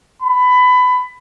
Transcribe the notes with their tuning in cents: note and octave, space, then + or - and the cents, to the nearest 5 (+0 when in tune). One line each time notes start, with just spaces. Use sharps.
B5 +20